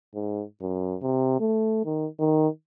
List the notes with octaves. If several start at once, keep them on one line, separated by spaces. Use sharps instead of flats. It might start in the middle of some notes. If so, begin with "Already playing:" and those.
G#2
F#2
C3
A3
D#3
D#3